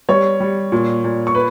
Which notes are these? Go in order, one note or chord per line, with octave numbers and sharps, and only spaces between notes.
G3 C#5 C#6
G3
A#2
A#2
C#6
B4